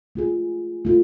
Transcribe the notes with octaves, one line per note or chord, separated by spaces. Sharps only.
A3 F4 G#4
A3 F4